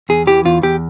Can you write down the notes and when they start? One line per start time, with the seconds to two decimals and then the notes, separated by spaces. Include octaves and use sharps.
0.09 E2 G#4
0.27 E3 G4
0.45 E2 F4
0.62 E2 G4